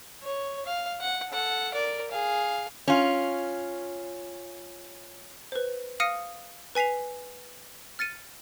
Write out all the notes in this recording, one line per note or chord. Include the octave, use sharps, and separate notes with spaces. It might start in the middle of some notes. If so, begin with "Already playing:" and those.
C#5
F5
F#5
A4 F#5
A#4 D5
G#4 F5
C#4 F4
B4 C5
F5 D#6 F6 A#6 C#7 D#7
B4 G#5 B6 C7 F7
F6 A6 C#7 D#7